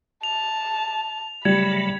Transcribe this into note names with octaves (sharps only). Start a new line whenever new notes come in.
A5 F7
C#3 F#3 G3 A3 B5 G#6